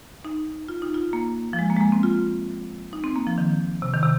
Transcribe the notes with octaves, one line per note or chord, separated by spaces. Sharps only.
D#4
F4
D#4
F4
A#3
F3
G#3
A#3
G#3
A#3
C4
F4
D#4
C4
A#3
F3
D#3
C3
D#3
C3